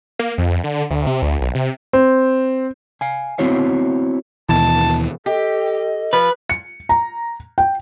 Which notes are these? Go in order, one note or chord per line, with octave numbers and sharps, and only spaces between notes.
A#3
F2
D3
D2
C3
D2
B1
C3
C4
F5 G#5
B3 C4 E4 F#4 C#5 F5
D#2 B2 E3 A5
G4 A4 D#5
F3 B4
C#7
A#5
G5